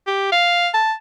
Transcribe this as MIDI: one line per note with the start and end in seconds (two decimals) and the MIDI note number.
0.07 0.30 67
0.32 0.68 77
0.74 0.93 81